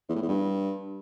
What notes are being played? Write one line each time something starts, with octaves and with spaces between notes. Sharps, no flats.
E2
A2
E2
G2